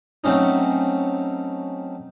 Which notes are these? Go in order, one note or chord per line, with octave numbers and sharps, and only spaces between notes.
F#3 A3 C4 C#4 D#4